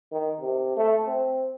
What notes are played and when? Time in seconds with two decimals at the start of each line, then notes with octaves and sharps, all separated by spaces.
0.12 D#3
0.40 C3
0.77 A3
1.06 C4